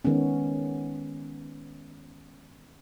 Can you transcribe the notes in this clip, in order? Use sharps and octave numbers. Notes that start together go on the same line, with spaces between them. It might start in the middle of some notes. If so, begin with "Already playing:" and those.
D#3 G#3 B3 C#4